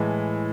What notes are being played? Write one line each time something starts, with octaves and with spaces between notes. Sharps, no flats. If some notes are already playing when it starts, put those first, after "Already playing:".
Already playing: A2 E3 G#3